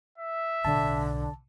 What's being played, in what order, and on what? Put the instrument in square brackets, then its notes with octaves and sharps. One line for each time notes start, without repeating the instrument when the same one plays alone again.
[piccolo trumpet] E5
[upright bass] B1 A2 [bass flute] D3 [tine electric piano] A5